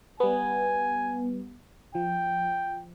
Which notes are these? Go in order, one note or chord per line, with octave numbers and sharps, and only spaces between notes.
G3 B3 G#5
F3 G5